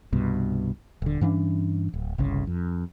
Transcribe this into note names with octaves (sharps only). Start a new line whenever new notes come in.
C2 G2 B2
D#1 D3
G2 E3 C#4 D4
D1
G1 C2 C#3
F2